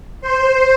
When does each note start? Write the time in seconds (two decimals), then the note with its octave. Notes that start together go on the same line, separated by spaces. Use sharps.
0.21 C5